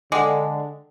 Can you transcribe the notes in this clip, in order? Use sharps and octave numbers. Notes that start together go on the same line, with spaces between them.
D3 G#3 F#5 G5 D6